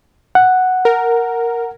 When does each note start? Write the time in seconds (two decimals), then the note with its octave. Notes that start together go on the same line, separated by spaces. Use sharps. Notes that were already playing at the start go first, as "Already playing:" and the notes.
0.35 F#5
0.85 A#4